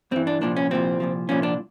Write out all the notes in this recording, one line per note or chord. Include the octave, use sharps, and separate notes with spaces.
G2 E3 C4
D4
C2 A#2 F3 D4
C#4
C2 A#2 F3 C4
C2 A#2 F3
C2 A#2 F3 C#4
D4